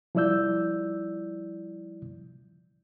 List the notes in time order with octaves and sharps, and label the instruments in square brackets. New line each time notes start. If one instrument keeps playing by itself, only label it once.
[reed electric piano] F3 G3 E4 D5 E6 G6